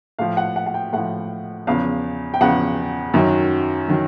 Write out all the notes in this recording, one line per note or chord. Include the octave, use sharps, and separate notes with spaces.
A2 F3 F5
F#5
F#5
F#5
G5
A2 F3 F#5
E2 C#3 F3 F5
G5
E2 C#3 F3 F#5
F#2 D#3 F#3
D#3 F#3